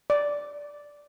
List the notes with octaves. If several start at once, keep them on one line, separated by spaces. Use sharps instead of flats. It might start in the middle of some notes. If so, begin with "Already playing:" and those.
D5